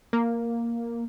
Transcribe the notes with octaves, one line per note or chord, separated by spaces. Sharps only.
A#3